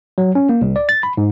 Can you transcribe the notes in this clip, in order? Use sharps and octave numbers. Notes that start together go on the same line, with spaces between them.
F#3
C#4
A#3
C2
D5
A6
B5
G#2